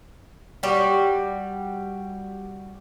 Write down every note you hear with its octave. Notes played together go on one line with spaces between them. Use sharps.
G3 F#4